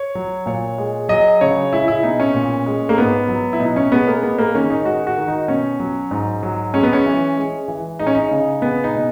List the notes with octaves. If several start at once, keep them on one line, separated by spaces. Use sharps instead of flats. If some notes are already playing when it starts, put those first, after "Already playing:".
Already playing: C#5
F#3
A#2 C#5
G#3
F#3 D#5
C#3 C#5
G#3 E4
E4
B2 D#4
C#4
A#2
G#3
A#3
G#2 B3
F#3
E4
B2 D#4
C#4
G#3 B3
A#3
G#3 B3
A#3
D#3 C#4
D#4
G#3 F#4
F#4
D#3
D#4
B2 C#4
F#3
G#2
F#3
G#3 C#4
B3
C#4
E3
G#3
E3
G#3 D#4
C#4
D#4
C#3
G#3 B3
D#4
B2